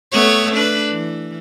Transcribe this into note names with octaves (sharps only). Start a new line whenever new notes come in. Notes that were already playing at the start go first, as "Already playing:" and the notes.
A3 B3 C#5
D4 B4
E3